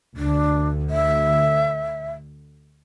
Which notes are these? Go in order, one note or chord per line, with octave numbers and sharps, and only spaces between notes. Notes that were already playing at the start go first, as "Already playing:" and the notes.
D2 D3 D4
E5